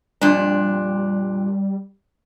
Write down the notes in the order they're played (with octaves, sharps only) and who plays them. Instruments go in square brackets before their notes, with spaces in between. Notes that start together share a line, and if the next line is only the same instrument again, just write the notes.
[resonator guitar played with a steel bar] F2 A#2 D4 [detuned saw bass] G3